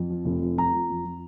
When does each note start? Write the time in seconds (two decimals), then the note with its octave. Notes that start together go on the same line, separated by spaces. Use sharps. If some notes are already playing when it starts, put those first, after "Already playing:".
Already playing: F2
0.10 F3
0.25 F1
0.41 F3
0.57 F3 A#5
0.73 F3
0.90 F2
1.05 F3